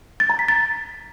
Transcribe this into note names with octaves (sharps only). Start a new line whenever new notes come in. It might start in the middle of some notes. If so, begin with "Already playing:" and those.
A6
A#5
B6
A6